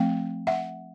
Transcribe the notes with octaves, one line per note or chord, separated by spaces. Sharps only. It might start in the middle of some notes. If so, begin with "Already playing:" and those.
Already playing: F3 A3 C4 F5 G5
E5 F#5